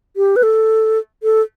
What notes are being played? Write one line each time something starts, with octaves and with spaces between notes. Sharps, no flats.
G4
B4
A4
A4